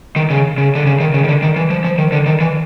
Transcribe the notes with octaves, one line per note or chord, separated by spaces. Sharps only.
D#3
C#3
C#3
D3
C#3
D#3
C#3
D#3
D3
D#3
E3
F3
F3
D#3
D3
D#3
E3